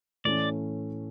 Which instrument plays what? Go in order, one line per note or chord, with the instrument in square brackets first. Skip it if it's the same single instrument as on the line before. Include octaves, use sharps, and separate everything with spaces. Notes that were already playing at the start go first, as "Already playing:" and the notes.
[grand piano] A2 E3 A3 C#4 [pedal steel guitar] D5